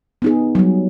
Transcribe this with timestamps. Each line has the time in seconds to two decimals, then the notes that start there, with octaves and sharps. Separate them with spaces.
0.22 B3 D#4 G#4
0.55 F#3 G3